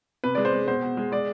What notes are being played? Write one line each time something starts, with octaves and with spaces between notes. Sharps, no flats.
C3 B4
G#3 D5
C5
G#3
B2 C5
B2
G#3
G#3 D5